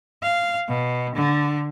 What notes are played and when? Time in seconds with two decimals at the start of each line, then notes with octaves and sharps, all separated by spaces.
0.23 F5
0.68 B2
1.15 D3